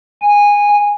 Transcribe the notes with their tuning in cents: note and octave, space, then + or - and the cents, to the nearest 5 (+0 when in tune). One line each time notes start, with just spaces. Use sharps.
G#5 -15